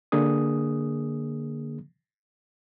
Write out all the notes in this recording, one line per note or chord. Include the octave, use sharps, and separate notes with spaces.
D3 A#3 D4 G#4 D#6